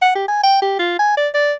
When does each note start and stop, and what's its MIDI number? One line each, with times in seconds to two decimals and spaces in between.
0.02 0.12 78
0.15 0.26 67
0.28 0.41 80
0.44 0.58 79
0.62 0.76 67
0.79 0.95 65
0.99 1.16 80
1.17 1.29 74
1.34 1.53 74